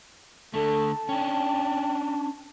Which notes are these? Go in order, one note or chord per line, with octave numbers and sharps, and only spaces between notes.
D3 A3 A4 A5
C#4 D4 G5